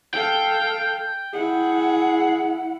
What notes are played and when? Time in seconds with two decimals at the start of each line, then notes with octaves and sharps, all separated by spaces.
0.14 A4 F5 G5
1.33 E4 G#4 F#5